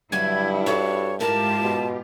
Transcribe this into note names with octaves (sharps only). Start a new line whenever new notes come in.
G2 D3 F#3 G3 E4 G#6
F#4 A4 C5 C#5
G#2 E4 F4 G4 A#4 A5
B2